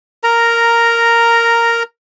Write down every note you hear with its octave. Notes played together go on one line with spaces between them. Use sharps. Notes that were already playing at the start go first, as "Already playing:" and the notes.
A#4 A#5